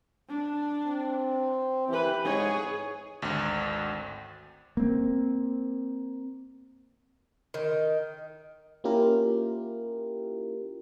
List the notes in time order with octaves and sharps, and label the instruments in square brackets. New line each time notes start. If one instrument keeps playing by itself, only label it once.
[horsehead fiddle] D4
[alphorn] C4
[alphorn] E3 [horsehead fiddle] G4 B4
[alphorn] G#2 [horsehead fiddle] G#4 C#5
[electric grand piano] G#1 D2
[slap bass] A#3 C4
[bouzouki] D#3
[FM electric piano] A#3 C#4 E4 F4 G4 A#4